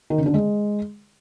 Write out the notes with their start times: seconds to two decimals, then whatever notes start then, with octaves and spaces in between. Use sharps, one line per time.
0.10 D#3
0.18 C#3
0.26 D3
0.34 G#3